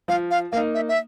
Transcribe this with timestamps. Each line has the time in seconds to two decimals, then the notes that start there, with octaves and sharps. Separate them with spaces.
0.08 F3 F5
0.31 F5
0.52 A#3 D#4 F5
0.74 E5
0.89 E5